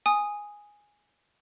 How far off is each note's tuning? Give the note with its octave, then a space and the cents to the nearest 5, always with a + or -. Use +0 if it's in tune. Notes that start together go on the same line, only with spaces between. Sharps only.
G#5 -5 D#6 +0